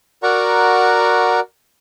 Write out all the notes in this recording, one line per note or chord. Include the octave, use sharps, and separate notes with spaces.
F#4 A#4 D5 F#5 A#5 C#6